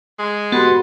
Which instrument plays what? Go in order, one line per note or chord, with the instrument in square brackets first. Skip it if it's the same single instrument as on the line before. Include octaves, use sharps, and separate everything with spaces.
[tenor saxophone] G#3
[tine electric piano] B3 G4 [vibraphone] F#4 A4 B4 [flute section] F#5 B5 C6